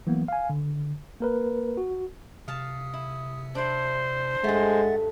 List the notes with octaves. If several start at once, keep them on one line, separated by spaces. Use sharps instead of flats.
E3 F#3 A#3 B3
F5 G#5
D3
A#3 A#4 B4
F#4
C3 F5 A5 D#6
E4
D4 E4 C5
G2 G#3 A3 E5 F#5 A6